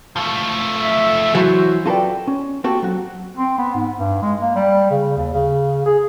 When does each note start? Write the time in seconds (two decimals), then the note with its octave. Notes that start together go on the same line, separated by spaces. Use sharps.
0.16 F3 A3
0.78 E5
1.35 E3 F#3 F#4 C5
1.86 F4 F#4 A4 B4 D5 G5
2.27 C#4
2.64 A#3 C4 F#4 G4 A4
2.83 F#3 F#4
3.37 C4
3.58 B3
3.74 G#2
3.98 G2
4.22 G#3
4.41 A#3
4.55 G3
4.90 C#3
5.16 D#2
5.33 C#3
5.86 G#4